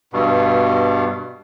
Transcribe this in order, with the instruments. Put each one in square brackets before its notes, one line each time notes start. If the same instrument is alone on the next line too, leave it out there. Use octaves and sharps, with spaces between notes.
[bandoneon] G2 B2